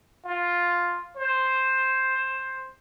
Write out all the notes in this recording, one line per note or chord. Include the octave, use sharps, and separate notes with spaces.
F4
C5